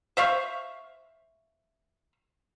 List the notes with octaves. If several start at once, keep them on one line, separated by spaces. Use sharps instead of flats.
C5 E5 F5 C#6